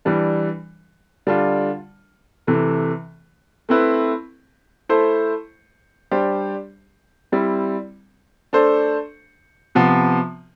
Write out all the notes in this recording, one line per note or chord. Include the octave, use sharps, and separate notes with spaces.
E3 G3 D4
D3 G3 D4 F4
C3 E3 A3
A3 C4 E4 B4
A3 E4 A4 C5
G3 D4 G4 C5
G3 C4 E4
A3 D4 A4 C5
C3 F3 B3